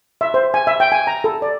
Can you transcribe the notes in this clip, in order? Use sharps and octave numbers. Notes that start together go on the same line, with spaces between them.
E5
C5
G#5
E5
G5
G#5
A#5
A4
D5